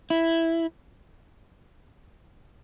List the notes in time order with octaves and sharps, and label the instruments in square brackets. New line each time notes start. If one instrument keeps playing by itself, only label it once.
[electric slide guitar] E4